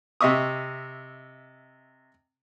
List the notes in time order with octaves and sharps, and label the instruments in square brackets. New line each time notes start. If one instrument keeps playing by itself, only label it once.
[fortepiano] C3 D#5 E5 C#6 D#6